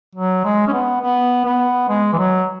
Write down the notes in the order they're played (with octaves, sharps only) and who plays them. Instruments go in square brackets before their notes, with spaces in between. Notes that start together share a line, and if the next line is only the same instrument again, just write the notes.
[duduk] F#3
G#3
C#4
B3
B3
B3
G#3
E3
F#3